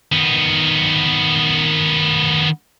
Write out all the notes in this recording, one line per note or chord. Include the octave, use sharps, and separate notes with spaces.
D#3 B3